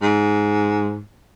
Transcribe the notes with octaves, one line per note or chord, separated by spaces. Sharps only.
G#2